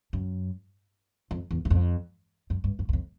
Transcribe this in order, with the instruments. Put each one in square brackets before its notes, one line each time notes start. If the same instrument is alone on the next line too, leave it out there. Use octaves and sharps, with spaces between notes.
[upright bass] F#2
F2
E2
F#2
F2
F#2
G2
F#2
E2
F2